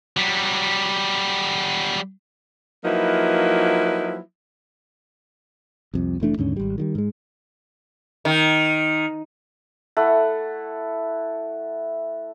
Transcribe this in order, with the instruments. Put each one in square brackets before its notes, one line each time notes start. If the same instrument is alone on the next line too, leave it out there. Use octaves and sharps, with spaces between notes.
[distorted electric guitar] F#3 G3
[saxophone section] F3 F#3 A#3 D#4 E4 B4
[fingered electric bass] C2 F2
F1 E3 A3 D4
D#2 G#2 D3 C#4
G#1 G3
D#3 F#3 G3
G#2 G#3
[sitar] D#3
[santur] A3 E4 A4 F#5